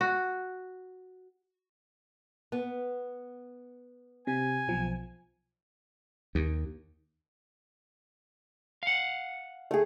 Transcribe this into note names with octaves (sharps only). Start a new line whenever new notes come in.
F#4
B3
C3 G#5
B1 F3
D#2
F5 F#5
A3 G#4